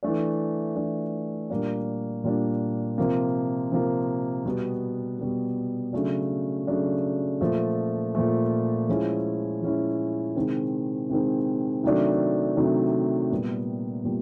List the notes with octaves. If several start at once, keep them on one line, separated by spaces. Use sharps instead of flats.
E3 A3 D4
E3 A3 D4
A#2 G3 A#3 D4
A#2 G3 A#3 D4
C3 F3 A#3
C3 F3 A#3
B2 G3 B3
B2 G3 B3
C#3 F#3 A3 D4
C#3 F#3 A3 D4
A#2 F3 A3
A#2 F3 A3
F3 G#3 C#4 E4
F3 G#3 C#4 E4
C3 D#3 G#3 C4
C3 D#3 G#3 C4
C3 D#3 F#3 A3 D4
C3 D#3 F#3 A3 D4
A#2 G3 B3
A#2 G3 B3